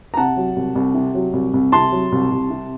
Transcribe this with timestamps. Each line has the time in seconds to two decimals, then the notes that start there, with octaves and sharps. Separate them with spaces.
0.14 A#5
0.17 C3 F#5 A5
0.37 F#3
0.56 C2
0.75 C2
0.94 C3
1.14 F#3
1.33 C2
1.54 C2
1.72 C3 A5 C6
1.92 F#3
2.12 C2
2.32 C2
2.50 C3